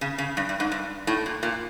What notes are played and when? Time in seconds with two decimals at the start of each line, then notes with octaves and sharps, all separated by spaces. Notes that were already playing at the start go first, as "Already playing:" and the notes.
0.01 C#3
0.18 C#3
0.37 G2
0.49 G2
0.60 G#2
0.72 G2
1.07 A2
1.26 A#2
1.43 A#2